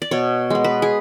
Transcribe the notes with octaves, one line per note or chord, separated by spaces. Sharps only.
D5
B2 C#5
G#3 B3
B4
G#4